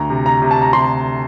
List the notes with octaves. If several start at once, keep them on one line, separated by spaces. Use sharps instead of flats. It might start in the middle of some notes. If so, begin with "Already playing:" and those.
Already playing: D2 A#5
C3
A#5
C3
A5
A#5
C3 C6